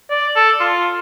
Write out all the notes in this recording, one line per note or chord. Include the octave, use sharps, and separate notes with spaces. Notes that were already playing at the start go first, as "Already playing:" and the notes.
D5
A4
F4